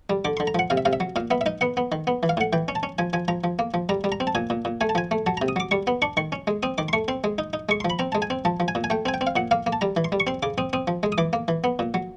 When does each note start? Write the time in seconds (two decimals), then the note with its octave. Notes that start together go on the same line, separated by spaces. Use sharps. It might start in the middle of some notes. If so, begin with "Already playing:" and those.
0.10 G3
0.25 D3 D6
0.37 C6
0.40 D3
0.47 A#5
0.55 F3 F#5
0.70 C3 F5
0.77 E5
0.85 C3 F5
0.93 E5
1.00 F#3
1.16 A#2 F5
1.31 B3 E5
1.41 E5
1.46 D#4 D#5
1.61 B3 F#5
1.77 B3
1.92 D#3
2.07 B3
2.23 E3
2.29 F5
2.37 A2 F#5
2.53 E3 G5
2.68 C#4
2.75 A5
2.83 C#4
2.98 F3 G#5
3.13 F3 G#5
3.28 F3 A#5
3.44 F3
3.59 A#3
3.74 F3
3.89 G3 A#5
4.04 G3
4.12 A#5
4.20 C4
4.27 A5
4.35 A#2 G#5
4.50 A#2
4.65 A#2
4.81 A3 G#5
4.89 A5
4.95 F3 G#5
5.11 A3
5.26 F#3 A5
5.37 A#5
5.42 C3
5.48 D#6
5.56 F#3 D6
5.71 G3 C#6
5.87 B3
6.02 D4 C#6
6.17 D#3 C#6
6.32 C#4
6.47 G#3
6.63 C4 D#6
6.78 D#3 D6
6.88 C6
6.93 A3 C#6
7.08 C4 C6
7.24 G#3
7.38 D#4
7.53 D#4
7.69 G#3 C#6
7.80 F3 C6
7.90 B5
7.99 C4 A#5
8.12 G#3 A5
8.22 G#5
8.30 C4
8.45 F3 A5
8.60 F3
8.68 G#5
8.75 A#2
8.84 G#5
8.90 A3 G5
9.06 C4 G#5
9.14 G5
9.21 C4
9.27 F5
9.36 A#2 F#5
9.51 A#3 F5
9.67 A#3
9.73 A5
9.81 G3 A#5
9.97 E3
10.04 C6
10.12 G3
10.20 C#6
10.27 C4 C6
10.43 C#3 D6
10.58 C4 D#6
10.73 C4 D#6
10.88 F3
11.03 G#3
11.12 D#6
11.18 E3 D6
11.33 A#3
11.48 E3
11.64 B3
11.79 A#2
11.94 F#3